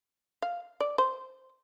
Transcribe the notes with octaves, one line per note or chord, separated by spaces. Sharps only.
F5
D5
C5